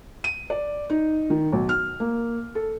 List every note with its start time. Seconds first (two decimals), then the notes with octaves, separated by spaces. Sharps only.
0.24 D#7
0.50 D5
0.90 D#4
1.30 D#3
1.52 B1
1.69 F6
2.00 A#3
2.55 A4